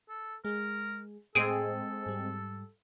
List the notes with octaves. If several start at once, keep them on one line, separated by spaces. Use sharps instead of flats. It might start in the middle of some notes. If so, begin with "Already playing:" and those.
A4
G#3 G#4 A#4
A2 G#3 C4 G#4 A4 D7 D#7
G#2 G3